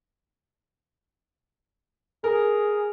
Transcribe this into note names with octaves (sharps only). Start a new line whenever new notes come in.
G#4 A#4